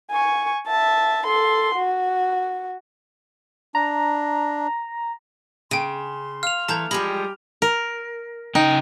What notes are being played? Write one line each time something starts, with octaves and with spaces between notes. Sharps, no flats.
G#5 C#6
E5 A5
A4 C6
F#4
D4 A#5
C#3 G5 C6 D7 D#7
F5 F6 F7
E3 A3 A5 A#5 G6
F3 G3 G#3 G4 B5
A#4
C#3 D#4 G5